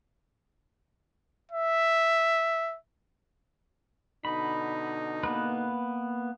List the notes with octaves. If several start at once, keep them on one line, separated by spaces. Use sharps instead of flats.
E5
B2 D3 D#4 B5
A#3 B3 B4